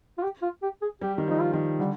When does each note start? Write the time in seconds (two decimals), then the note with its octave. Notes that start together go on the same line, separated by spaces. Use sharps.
0.18 F4
0.23 G4
0.42 F4
0.62 G4
0.82 G#4
1.02 G3 G4
1.18 D#3
1.28 F3
1.31 D#4
1.40 F4
1.53 D#3
1.79 D3 G3